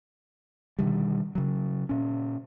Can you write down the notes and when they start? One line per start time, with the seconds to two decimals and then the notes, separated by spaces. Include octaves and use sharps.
0.79 B2 D3 D#3 G3
1.35 C#3 F#3
1.89 A#2 C#4